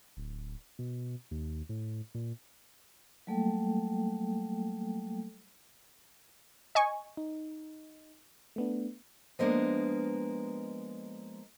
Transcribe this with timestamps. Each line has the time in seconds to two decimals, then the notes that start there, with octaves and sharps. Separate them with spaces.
0.17 D1
0.79 B2
1.31 D#2
1.69 A2
2.15 A#2
3.27 F#3 G3 A3 A#3 A4 G5
6.75 D#5 G#5 C#6
7.17 D#4
8.56 A3 B3 D4
9.39 F3 G#3 A#3 B3 D4